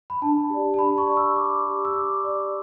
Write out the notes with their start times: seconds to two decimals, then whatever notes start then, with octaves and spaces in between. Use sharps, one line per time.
0.10 B5
0.22 D4 A5
0.50 G4 D5
0.74 A5
0.79 D4 B5
0.98 C#6
1.07 G4 D5
1.17 E6
1.36 D4 D6
1.65 G4 D5
1.85 E6
1.94 D4 D6
2.22 G4 D5